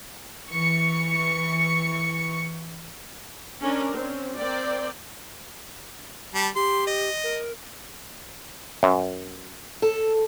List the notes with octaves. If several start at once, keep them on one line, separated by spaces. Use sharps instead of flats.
E3 C#6 C#7
C#4 D4 A#4 D5
C4 C#4
C4 A#4 D5 G5
G3 A5
G4 C6
D#5
A#4
F#2
A4